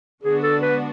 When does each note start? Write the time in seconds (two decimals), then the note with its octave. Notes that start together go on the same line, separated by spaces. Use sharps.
0.23 D3 G#3 B3 D4 F#4 G#4
0.43 A4
0.62 B4